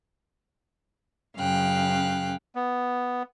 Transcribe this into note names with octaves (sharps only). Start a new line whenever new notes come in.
F#2 C#3 F5 G5 F#6
B3